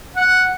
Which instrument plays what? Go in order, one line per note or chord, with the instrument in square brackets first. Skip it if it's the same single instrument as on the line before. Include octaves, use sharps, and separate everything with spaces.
[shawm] F#5